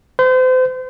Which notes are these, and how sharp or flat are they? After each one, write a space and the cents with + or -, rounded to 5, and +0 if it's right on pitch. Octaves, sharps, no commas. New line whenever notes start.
C5 -35